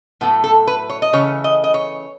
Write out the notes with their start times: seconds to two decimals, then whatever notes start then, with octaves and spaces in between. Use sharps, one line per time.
0.21 A2 F#3 A3 B3
0.44 A4
0.67 B4
0.89 C#5
1.02 D#5
1.13 C#3 E3 A3 C#5
1.44 D#5
1.64 D#5
1.74 C#5